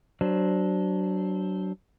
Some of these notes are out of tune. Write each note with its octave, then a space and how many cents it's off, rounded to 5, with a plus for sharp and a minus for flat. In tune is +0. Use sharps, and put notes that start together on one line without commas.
F#3 +25 D4 +0 C5 +0